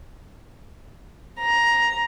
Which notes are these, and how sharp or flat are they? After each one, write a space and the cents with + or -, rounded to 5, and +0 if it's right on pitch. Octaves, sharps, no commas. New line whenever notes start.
A#5 +10